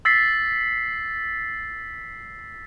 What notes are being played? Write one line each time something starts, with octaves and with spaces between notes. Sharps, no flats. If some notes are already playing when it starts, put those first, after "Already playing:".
E6 A6 B6 C7